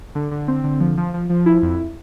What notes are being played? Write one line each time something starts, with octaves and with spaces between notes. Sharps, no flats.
D3
D3
C4
D3
F3
F3
F3
F3
E4
F2